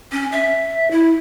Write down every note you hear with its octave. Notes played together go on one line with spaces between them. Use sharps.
C#4
E5
E4